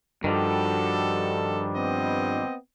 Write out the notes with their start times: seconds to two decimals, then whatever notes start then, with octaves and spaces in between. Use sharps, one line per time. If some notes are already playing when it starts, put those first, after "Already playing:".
0.24 G2 D#3 F3 G3 F#4 A4
1.75 B3 C4 D#5